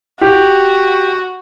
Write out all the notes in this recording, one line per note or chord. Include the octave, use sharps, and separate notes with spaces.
F#4 G4